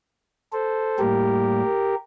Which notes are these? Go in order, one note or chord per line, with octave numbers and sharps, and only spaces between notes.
A4 C5
A2 G3 A#3 G4 A#4